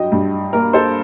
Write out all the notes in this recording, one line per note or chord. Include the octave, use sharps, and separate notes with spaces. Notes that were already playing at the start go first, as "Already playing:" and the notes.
Already playing: G2 F#3 D#5 G5
G2
A#3 A#4
A4 C5